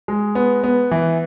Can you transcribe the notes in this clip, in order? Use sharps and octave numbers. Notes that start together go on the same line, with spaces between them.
G#3
B3
B3
E3